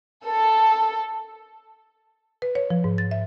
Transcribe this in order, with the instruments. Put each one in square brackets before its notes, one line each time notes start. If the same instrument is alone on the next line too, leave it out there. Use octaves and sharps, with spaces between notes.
[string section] A4
[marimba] B4
C#5
F3
G#2
A6
E5